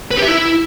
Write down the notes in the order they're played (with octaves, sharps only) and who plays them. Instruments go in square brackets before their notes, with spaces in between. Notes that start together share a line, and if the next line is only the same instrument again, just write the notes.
[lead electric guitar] B4
G4
E5
E4